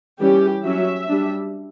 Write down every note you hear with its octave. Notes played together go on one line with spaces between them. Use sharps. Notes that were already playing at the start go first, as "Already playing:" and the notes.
E3 G3 C#4 G4
F#3 C#4 E5
G3 D4